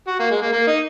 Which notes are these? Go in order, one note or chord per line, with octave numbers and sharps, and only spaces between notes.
F#4
A#3
G#3
A#3
A#3
D#4